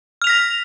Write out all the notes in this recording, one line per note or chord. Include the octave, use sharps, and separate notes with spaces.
F6 A#6 B6 F7